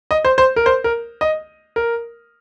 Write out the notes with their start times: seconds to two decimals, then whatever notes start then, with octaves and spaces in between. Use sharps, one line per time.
0.11 D#5
0.25 C5
0.38 C5
0.56 A#4
0.66 C5
0.84 A#4
1.21 D#5
1.76 A#4